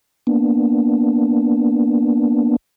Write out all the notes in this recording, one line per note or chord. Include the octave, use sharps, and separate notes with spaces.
A#3 B3 D4